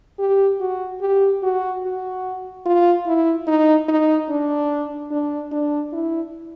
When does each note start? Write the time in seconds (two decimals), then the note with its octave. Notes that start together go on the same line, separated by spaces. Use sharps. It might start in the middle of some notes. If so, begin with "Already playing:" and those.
0.19 G4
0.60 F#4
1.01 G4
1.43 F#4
1.83 F#4
2.66 F4
3.06 E4
3.47 D#4
3.89 D#4
4.30 D4
5.11 D4
5.52 D4
5.93 E4